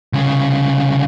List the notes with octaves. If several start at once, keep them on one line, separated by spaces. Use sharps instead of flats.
C2 C#3